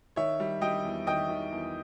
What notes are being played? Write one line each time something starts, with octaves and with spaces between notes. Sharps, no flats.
D#3 C#5 E5
G3
G3 D#5 G5
E2
D#3 D#5 G5
D#3
E2